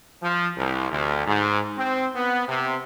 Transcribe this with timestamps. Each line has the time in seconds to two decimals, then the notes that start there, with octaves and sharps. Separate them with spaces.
0.22 F3
0.57 C2
0.91 D2
1.26 G#2
1.77 C4
2.15 B3
2.48 C3